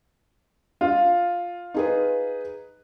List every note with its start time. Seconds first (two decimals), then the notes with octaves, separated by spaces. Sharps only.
0.81 F4
1.74 D#4 G#4 B4